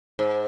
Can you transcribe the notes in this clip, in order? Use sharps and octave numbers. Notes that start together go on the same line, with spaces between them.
G#2